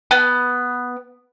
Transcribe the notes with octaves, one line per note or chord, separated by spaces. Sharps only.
B3